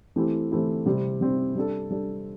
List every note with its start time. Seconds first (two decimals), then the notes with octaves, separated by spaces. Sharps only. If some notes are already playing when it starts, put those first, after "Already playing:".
0.16 E3 A3 C4 E4 G4
0.51 E3 A3 C4 E4 G4
0.86 C3 G3 C4
1.21 C3 G3 C4
1.55 G3 D4 A4
1.90 G3 D4 A4